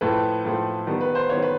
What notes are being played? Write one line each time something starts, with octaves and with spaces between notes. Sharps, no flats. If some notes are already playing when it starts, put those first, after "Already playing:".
A2 F3 A3 B4
A2 F3 A3
D#3 G3 B3
B4
C5
D#3 G3 B3 C#5
B4